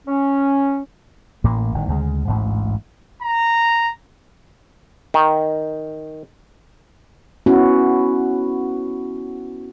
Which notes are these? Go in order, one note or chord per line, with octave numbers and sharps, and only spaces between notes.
C#4
A1 A2 A#3
G1 A2 D#3
D2 C#3 G#3
A1 D2 G#2
A#5
D#3
B3 C#4 E4 F#4